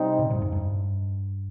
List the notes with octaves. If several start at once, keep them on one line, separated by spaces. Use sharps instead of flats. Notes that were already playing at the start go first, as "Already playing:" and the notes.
Already playing: C3 G3 C4 D#4
A#2 C#3
G2 A#2
F2 G#2
G2